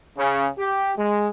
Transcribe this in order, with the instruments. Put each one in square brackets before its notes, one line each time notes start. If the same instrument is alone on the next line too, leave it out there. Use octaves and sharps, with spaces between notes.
[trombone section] C#3
G4
G#3